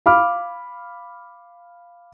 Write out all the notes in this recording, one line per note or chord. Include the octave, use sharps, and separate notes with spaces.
F5 B5 D6 F6